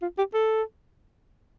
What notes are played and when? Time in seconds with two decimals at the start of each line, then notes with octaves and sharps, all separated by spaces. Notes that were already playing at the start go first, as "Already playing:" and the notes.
0.02 F4
0.18 G4
0.34 A4